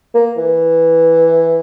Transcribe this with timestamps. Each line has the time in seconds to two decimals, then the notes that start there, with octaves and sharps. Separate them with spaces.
0.14 A#3
0.37 E3